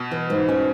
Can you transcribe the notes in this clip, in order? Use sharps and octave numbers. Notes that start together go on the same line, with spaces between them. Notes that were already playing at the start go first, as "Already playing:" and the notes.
Already playing: B2
E3
G#2
C#4